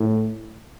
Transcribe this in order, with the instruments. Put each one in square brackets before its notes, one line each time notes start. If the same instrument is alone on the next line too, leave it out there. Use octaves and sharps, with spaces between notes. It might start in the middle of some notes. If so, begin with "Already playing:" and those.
Already playing: [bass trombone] A2